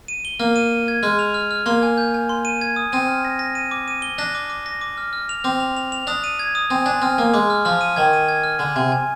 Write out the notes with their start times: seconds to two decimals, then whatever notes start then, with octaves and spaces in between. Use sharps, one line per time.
0.08 D#7
0.25 G7
0.40 A#3 F6
0.56 D#7
0.71 D#7
0.88 G#6
1.03 G#3 F6
1.19 F7
1.34 F6
1.51 F6
1.66 A#3 C6
1.83 G#5
1.98 G6
2.14 G#5
2.29 C6
2.45 D#7
2.61 G#6
2.76 D#6
2.92 C4 D#7
3.08 F6
3.25 A#6
3.39 A#6
3.55 D#7
3.71 D6
3.88 D#7
4.02 G7
4.18 D4 A#6
4.35 D6
4.50 D6
4.66 A#6
4.81 D6
4.97 F6
5.13 F6
5.29 F7
5.44 C4 D6
5.60 F7
5.77 F7
5.92 F7
6.07 D4 D#6
6.24 D#7
6.39 G#6
6.55 D#6
6.70 C4 G#5
6.86 D4 G#5
7.02 C4 F6
7.18 A#3 G#5
7.34 G#3 D6
7.50 F6
7.65 F3 F6
7.81 D#7
7.96 D#3 G#6
8.13 D#7
8.28 G#6
8.44 F6
8.59 D3 G#5
8.76 C3 G#5
8.92 G#5